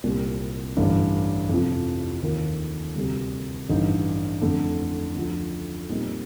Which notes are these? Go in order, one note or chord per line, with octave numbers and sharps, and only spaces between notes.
C2 A#2 G3 C4
A1 G2 D3
F2 C3 F3
D#2 D#3 A#3 F4
D2 C3 G3
A1 G2 D3 A3 D#4
F2 D3 A3
D2 D3 F3
A#2 G3 C4 D#4